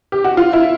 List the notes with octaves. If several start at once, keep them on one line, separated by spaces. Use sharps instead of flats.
G4
F#4
F4
E4